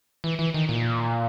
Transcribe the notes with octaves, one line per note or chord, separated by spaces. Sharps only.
E3
E3
D#3
A#2